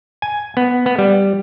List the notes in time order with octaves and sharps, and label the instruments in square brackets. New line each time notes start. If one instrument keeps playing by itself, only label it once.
[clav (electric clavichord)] G#5
B3
B3
G3